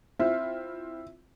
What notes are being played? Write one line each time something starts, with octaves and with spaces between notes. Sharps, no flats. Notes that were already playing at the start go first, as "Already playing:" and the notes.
C4 E4 F4 E5